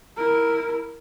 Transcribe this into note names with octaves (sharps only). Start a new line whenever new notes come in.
E4 A#4